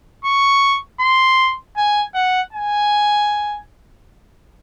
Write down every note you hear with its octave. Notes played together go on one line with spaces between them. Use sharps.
C#6
C6
G#5
F#5
G#5